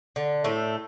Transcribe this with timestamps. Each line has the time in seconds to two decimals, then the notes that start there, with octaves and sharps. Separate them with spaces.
0.16 D3
0.44 A2 A3